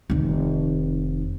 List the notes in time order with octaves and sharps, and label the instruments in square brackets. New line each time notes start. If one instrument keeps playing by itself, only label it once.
[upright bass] F1 D#3